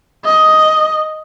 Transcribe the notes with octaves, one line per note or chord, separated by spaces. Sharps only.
D#5